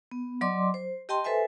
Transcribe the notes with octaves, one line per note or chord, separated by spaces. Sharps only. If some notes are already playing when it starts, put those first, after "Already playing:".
B3
F#3 D5 D#5 C6 D6
C5
G4 D#5 G5 A5 C6
A4 B4 C5 E5 G#5